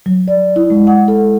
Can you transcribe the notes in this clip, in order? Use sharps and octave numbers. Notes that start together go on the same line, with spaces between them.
F#3
D5
E4
G#3
F#5
A4